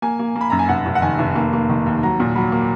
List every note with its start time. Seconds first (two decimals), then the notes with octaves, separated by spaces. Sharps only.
0.02 A#3 G#5
0.19 A#3
0.36 A#3
0.41 B5
0.50 F#2 A#5
0.59 G#5
0.69 F1 F#5
0.86 F1
0.95 F#5
1.02 D#3 G#5
1.19 F1
1.35 A#3
1.53 A#3
1.69 D#3
1.86 D#2
2.03 F#3 A#5
2.20 A#2
2.35 F#3 B5
2.52 A#3